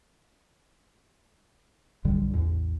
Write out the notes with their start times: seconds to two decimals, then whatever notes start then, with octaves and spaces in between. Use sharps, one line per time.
2.04 B1 F#2 D3 G3
2.30 A1 E2